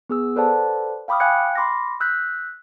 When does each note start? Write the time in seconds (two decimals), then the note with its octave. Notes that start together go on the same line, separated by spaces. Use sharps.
0.10 B3 G#4 E6
0.36 A4 B4 C5 D5 F#5 A5
1.08 F5 G5 B5 D6 D#6 F6
1.20 F5 G5 G#5 F#6 G#6 C#7
1.55 B5 C6 D6 F6 A#6
2.00 E6 F#6 G6 B6